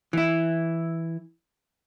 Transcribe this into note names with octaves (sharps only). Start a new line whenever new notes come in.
E3 E4